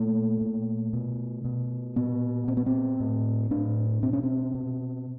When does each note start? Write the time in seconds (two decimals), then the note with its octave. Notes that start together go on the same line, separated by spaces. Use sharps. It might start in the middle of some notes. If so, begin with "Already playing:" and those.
Already playing: A#2 A3
0.41 A#2
0.93 B2
1.45 B2
1.96 A#2 B3
2.47 A#2 C4
2.57 B3
2.66 C4
3.00 A2
3.50 A2 D4
4.03 B2 C4
4.13 C#4
4.23 C4
4.55 B2